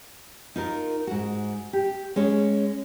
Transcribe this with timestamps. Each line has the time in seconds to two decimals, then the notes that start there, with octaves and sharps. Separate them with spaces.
0.56 D#4 F4 A#4
1.07 G#2 F#4
1.73 G4
2.16 G#3 C#4 G#4 C#5